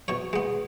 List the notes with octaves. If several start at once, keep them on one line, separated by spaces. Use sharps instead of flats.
B2 C#5
G#3 B3